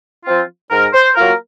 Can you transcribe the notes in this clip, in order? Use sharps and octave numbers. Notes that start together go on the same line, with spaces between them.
F3 C4 F4
G#2 A#4
C5
F#3 A#3 F4 A#4